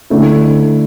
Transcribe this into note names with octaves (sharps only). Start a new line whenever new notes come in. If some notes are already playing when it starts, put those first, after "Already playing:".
D3 A3 E4